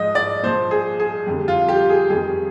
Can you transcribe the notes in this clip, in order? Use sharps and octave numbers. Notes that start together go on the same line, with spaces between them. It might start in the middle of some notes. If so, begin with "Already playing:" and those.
Already playing: G#2 F3 D#5
D5
A#2 F3 C5
G#4
G#4
F2 D3 G3
F4
G4
G#4
F2 D#3 G3 G#4